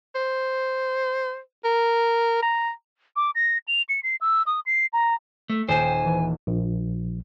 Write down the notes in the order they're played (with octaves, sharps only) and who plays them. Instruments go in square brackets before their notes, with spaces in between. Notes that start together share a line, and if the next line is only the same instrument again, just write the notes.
[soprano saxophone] C5
A#4
A#5
[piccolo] D6
A#6
F7
C#7
C7
E6
D#6
C7
A#5
[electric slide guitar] A3
[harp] D#1 E7 [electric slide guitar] C5 [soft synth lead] G5 [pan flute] G#5
[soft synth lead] E3
[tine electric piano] A#1